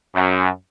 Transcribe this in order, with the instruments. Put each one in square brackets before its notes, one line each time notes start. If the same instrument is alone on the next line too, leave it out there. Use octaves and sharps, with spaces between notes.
[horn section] F#2